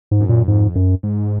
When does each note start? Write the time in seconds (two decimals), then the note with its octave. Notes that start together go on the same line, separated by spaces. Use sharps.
0.11 G#2
0.20 F#2
0.29 A#2
0.47 F2 G#2
0.75 F#2
1.03 G#2